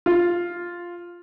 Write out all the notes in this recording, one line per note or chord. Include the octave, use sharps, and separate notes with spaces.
F4